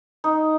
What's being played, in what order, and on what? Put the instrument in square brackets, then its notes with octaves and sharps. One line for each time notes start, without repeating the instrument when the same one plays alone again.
[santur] D#4